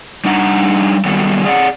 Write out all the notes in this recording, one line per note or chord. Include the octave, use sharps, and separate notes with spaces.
G3 D4 D#4 F#5 G5 A#5
D#3 F#3 G3 B3 A4
G#4 D5 F5 F#5